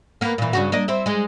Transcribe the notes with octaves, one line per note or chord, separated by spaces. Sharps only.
A#3 B3
A#2 E3
G2 C#3 F#4
A#3 D4 D#5
C4 E4
G#3 D#4